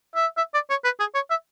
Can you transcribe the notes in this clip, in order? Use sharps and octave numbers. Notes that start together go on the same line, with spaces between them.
E5
E5
D5
C#5
B4
G#4
C#5
E5